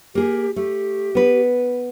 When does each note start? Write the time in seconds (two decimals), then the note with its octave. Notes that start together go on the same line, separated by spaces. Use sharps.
0.15 A#3 G4 G#4
0.56 A3 G4
1.15 B3 B4